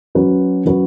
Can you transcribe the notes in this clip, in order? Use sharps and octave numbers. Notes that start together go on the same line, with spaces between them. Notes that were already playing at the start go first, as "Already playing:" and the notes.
F#3 C#4 F#4 B4
F#3 C#4 F#4 B4